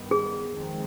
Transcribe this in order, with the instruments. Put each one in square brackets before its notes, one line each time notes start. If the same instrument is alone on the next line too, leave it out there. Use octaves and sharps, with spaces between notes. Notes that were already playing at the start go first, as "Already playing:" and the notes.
Already playing: [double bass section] G2 D#3 G3 B3
[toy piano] G#4
[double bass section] F2 D#3 G#3 C4